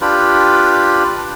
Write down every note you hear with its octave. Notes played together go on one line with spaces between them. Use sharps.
D4 F4 G4 B4